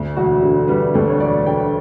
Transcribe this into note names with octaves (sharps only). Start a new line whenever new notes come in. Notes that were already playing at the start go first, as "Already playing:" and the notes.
Already playing: D2
E1 F#4
D3
G3 B4
D2 A4
C#5
E1 D5
D3 G5